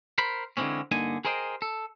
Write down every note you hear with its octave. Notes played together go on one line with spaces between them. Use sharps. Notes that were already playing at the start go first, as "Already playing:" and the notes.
A#4 C5 B5
D3 E3 F#3 G#3 C4 C#4
G2 D3 A#3 D#4 G#5
G#4 A#4 C5 D#5 G5
A4